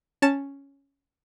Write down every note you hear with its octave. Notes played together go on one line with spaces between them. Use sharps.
C#4 A5 A6 E7